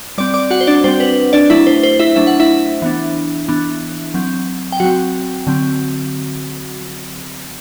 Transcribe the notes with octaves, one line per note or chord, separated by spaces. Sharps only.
G3 C4 D5 D6
D5 D6
F#4 F#5
C5
D4 D5
G3 C4 C5
B4
D4 D5
F#3 A3 D4 E4 E5
C5
C5
E4 E5
F#3 A3 D4 E5
F#5
E4 E5
E3 B3 D4
E3 B3 D4
F#3 C4
G5
F#3 C4 F#4 F#5
D3 F#3 C4